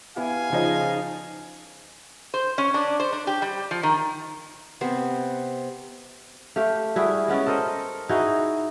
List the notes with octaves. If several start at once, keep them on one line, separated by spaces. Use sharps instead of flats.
B3 E4 G4 F5 G#5
C#3 F3 D#4
C5
C#4
D4
C5
D4
G4
G3
F3
D#3
C3 B3 C5
A3 G4 F5
G3 E4 F#4 G#4
G#3 B3 C#4 D5
A4 A#4 C5 D#5
D#4 E4 F#4 G#4